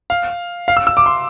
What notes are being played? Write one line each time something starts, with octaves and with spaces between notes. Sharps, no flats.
F5
F5
E6
E6
D6
C6